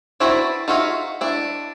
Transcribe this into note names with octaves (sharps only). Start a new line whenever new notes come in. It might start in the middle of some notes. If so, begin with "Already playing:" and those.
C4 D4 E4 F#4 B4
D#4 F4 F#4 G#4 E5
D4 E4